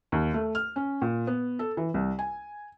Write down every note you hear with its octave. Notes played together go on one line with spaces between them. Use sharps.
D#2
A3
F6
C#4
A#2
B3
A4
E3
C2
G#5